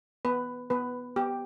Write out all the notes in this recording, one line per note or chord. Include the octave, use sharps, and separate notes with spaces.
B3 B4
B3 B4
B3 G4